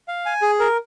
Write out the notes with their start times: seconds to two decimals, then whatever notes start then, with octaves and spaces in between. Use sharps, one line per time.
0.08 F5
0.26 G#5
0.42 G#4
0.60 A#4